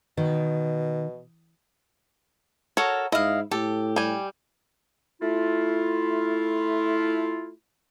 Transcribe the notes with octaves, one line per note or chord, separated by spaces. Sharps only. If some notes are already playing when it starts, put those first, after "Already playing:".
B2 D#3
F#4 A4 A#4 C#5
G#2 E4 D#5 F5
A2 G4 A4
G3 G#5
A3 E4 F4